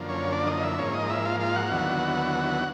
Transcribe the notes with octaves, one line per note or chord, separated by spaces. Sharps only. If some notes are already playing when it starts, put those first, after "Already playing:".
Already playing: F#2 D3 F3 A#3
C#4 C#5
D4 D5
D#4 D#5
E4 E5
G#2 F3 A#3 C#4 C#5
D#4 D#5
E4 E5
F4 F5
F4 F5
F#4 F#5
D#2 D3 F#3 B3 E4